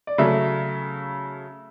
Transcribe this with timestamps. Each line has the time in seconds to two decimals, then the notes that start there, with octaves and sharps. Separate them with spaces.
0.07 D5
0.18 C#3 F#3 A3 E5